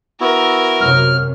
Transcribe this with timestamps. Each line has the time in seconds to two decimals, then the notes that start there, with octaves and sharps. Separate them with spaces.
0.21 B3 E4 F#4 A#4
0.81 F#2 C3 F#3 F6